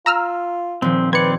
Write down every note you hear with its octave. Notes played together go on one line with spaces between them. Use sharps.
F4 A#5 E6 F6
D#1 F3 C4
C4 B4 D5 G#6 C#7